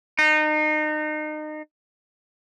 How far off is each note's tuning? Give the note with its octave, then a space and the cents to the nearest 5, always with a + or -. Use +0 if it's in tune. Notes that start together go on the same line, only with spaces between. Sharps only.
D#4 -30